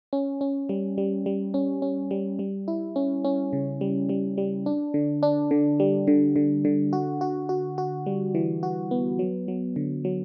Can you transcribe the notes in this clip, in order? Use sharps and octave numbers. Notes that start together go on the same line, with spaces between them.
C#4
C#4
G3
G3
G3
C#4
C#4
G3
G3
E4
C#4
C#4
C#3
G3
G3
G3
D4
D3
D4
D3
G3
D3
D3
D3
F#4
F#4
F#4
F#4
G3
E3
F#4
B3
F#3
F#3
D3
F#3